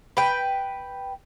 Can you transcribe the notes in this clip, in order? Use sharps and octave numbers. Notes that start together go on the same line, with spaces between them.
B4 G5